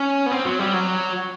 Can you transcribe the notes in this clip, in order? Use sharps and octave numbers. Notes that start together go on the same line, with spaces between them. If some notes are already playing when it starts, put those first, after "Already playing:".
Already playing: C#4
B3
C4
F#3
G3
F#3